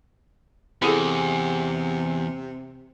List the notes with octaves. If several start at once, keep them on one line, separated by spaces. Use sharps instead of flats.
E2 C3 E4 G#4 A4